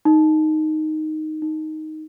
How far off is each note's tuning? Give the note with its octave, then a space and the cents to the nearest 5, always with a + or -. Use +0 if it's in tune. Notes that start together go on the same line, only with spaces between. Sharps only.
D#4 +0
D#4 +5